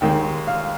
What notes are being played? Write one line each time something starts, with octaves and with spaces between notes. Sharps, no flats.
D#2 D#3 G#3 G5
F5